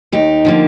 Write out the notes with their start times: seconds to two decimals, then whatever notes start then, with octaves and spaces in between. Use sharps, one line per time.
0.12 D#2 D#4 G4
0.45 D3 F3 A#3